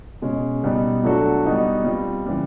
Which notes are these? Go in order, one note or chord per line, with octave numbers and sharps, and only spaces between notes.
B2 G#3 C#4
B2 G3 B3 D#4
F#3 A3 D4 F#4 A4
G3 B3 D#4 F#4
G3 C4 F4
C#3 E3 G3